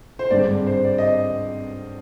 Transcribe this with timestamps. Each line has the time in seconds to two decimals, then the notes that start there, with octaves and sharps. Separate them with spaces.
0.19 C5
0.30 G#1 G2 D3 G#3 C4 D5
0.66 C5
0.85 D5
0.98 D#5